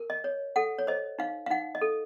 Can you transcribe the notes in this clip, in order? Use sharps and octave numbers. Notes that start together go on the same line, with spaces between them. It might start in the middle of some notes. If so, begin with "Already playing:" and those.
Already playing: A#4
D#5
C#5
A4 F#5
C#5
C5 D#5
D#4 F5
F5
D#4 F#5
D#5
A4